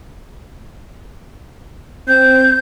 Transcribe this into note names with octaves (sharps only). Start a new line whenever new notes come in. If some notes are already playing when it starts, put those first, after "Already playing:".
C4 G6